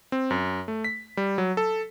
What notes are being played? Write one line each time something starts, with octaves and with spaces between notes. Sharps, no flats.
C4
F#2
A3
B6
G3
F#3
A4